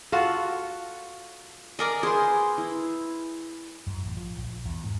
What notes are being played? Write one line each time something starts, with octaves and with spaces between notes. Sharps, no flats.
F4 F#4 A4 F#5
G#4 A#4 D5 D#5
G#4 B4 C5 C6
E4
F#2
A1
F3
A#1
E2
G#2